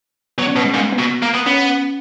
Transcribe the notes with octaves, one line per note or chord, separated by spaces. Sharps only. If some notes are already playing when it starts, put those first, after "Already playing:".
F#3 B3
C#4
B2 B3
G#3
G#2 A#3
B3
B2
A#3
B3
B3 C#4